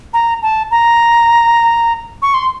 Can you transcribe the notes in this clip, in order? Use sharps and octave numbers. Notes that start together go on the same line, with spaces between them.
A#5
A5
A#5
C#6
C6